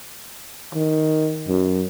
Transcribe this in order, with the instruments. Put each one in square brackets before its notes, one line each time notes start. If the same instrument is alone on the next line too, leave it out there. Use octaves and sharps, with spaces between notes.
[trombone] D#3
F#2